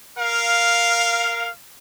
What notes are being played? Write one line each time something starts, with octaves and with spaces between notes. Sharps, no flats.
A#4 F5